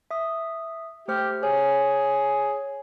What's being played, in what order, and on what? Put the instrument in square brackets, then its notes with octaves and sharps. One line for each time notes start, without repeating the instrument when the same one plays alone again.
[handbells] E5 D#6
[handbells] A3 C5 F6 [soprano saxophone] G4
[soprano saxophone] G#4 [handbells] C#5